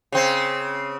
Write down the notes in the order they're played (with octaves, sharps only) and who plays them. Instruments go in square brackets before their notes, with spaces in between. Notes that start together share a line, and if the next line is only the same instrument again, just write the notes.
[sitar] C#3 C4